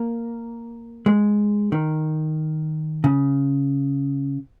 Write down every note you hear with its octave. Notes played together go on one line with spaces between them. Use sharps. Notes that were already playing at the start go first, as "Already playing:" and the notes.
Already playing: A#3
G#3
D#3
C#3